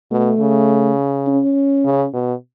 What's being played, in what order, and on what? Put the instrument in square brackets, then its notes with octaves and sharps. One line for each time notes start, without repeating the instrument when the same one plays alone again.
[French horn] B2 [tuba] A3
[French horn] C#3
[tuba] C#4
[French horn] C#3
B2